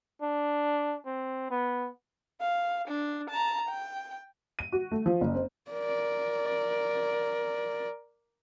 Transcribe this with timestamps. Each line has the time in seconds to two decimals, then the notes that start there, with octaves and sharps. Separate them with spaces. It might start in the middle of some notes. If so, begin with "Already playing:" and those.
0.22 D4
1.05 C4
1.51 B3
2.41 F5
2.89 D4
3.31 A5 A#5
3.70 G5
4.59 D#7
4.72 F#4
4.92 A3
5.06 F3
5.21 F#1
5.35 C4
5.71 A#4 D5